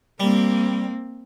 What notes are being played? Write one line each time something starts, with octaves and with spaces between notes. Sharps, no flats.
G3 A#3 C4